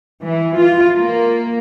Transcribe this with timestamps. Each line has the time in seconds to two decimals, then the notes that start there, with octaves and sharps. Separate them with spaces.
0.23 E3
0.60 F4
0.96 A#3